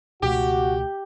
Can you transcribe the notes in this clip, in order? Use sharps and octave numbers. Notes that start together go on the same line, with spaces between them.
C#2 B2 A3 F#4 G4 F#5